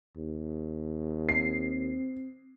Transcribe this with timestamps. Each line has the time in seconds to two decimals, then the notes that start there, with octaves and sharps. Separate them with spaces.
0.17 D#2
1.29 C4 C7